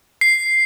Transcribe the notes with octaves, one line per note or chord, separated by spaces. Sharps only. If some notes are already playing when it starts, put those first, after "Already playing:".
C7